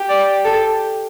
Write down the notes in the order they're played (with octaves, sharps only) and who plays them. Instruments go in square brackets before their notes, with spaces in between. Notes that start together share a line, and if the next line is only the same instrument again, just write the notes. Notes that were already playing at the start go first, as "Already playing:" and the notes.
Already playing: [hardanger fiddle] G4
[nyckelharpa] D5
A4